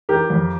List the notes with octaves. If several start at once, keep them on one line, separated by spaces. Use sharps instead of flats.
E3 G4 A#4
F2